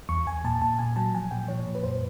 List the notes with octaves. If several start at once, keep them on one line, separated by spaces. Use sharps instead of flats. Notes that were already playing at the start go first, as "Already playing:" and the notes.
E2 C#6
E2 G#5
A#2 A5
A#2 A5
A#2 G#5
F#3 A5
F3 G#5
A#2 G5
F3 C#5
A#2
B4
F#2 C5